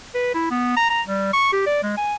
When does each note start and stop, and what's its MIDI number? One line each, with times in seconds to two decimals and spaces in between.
0.14 0.32 71
0.35 0.47 64
0.51 0.73 59
0.77 0.90 82
0.90 1.02 82
1.07 1.28 55
1.33 1.52 85
1.53 1.64 67
1.66 1.79 74
1.83 1.94 56
1.97 2.15 80